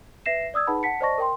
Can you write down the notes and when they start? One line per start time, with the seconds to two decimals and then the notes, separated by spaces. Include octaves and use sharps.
0.26 B4 E5 A#6 C7 E7
0.54 D5 D#6 E6 G#6
0.67 D#4 G#4 B4 F#5 A5 B5
0.83 F#5 A5 B6 C#7
1.01 C5 D5 D#5 A5 C#6 A#6
1.18 A#4 G5 C6